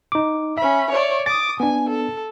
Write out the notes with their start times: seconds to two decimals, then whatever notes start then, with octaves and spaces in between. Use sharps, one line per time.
0.12 D#4 D6
0.58 C#4 E5 B5
0.91 C#5 D5
1.26 D6 D#6 A6
1.60 B3 D4 G#5
1.89 A4